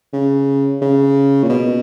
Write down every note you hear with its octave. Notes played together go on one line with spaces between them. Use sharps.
C#3
C#3
A#2
B2